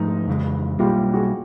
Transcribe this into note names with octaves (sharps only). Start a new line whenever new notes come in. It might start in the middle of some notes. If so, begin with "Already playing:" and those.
Already playing: G#2 F3 A3 D#4
F2 C#3 E3 G#3
B1 B2 G3 A#3 F4 G4
F#4 G#4